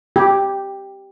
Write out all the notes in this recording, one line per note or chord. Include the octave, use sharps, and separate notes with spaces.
G4